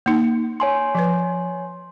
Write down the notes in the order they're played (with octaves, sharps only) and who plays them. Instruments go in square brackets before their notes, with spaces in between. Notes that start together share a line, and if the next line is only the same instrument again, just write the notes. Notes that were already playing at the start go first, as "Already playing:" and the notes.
[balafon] A#3 D#4
[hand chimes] C#5 G#5 C6
[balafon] F3 B4